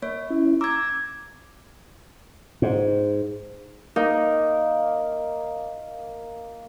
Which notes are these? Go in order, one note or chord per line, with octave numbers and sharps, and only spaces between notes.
A#3 C#5
C#4 E4
A#5 D6 E6 G#6
G#2
A#3 D#4